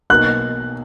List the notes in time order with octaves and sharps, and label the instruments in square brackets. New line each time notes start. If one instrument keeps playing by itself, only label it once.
[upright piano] B1 B2 A#3 D#4 A#4 [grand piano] F#6